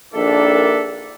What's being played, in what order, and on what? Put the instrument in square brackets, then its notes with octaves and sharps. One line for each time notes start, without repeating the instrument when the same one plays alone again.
[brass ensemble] A#1 D#3 D4 A4 D5 E5